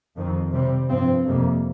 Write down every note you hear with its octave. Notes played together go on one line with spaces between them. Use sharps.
F2 D#3 C4
C3 G3 C4
G2 F3 C4
F2 C3 G3 A#3